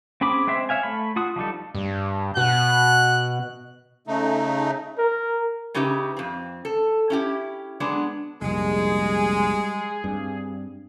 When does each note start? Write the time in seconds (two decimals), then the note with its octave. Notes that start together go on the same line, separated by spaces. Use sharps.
0.21 C4 C#4 G#4 B5 D6
0.47 G#3 C4 C5 E5
0.69 C#5 E5 F5 G#5
0.83 A3 B5
1.16 F4 F#4 D#6
1.36 F3 G3 D#4 A4
1.75 G2
2.37 B2 F#4 F#6
4.07 C#3 A3 D#4
4.98 A#4
5.74 C#3 C#4 D#4 G4 B4 E5
6.17 F2 C4
6.65 A4
7.10 C#4 E4 G4
7.80 F#3 G#3 B3 D4
8.42 F1 A#1 G3 G#3 G#4
10.04 G2 C4